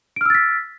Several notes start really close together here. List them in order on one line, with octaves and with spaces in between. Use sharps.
D7 F6 E6 A6 B6